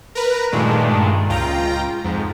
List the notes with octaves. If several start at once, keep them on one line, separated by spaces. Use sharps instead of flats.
A#4 B4
G2 A#2 D#3 G#3 A3 D4
C#2 F4 G5 A#5
F2 G#2